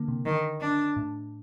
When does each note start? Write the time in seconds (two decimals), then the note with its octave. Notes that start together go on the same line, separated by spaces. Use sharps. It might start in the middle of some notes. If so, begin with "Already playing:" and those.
Already playing: D3 A#3
0.08 C3
0.26 D3 D#3
0.61 D4
0.97 A2